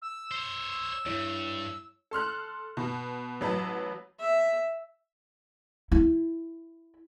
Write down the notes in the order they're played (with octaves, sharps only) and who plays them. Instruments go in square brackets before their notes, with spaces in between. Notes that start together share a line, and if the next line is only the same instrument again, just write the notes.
[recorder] E6
[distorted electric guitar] C5 C#5
[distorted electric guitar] E2 G2 [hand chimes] E4 C#5 D7
[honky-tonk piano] A4 C6 F6 F#6
B2
A1 F#3 B4 A5
[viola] E5
[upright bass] E4